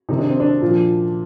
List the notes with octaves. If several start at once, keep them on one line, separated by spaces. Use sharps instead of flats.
C3 D#3 D#4
D4
C4
D4
A#2 F3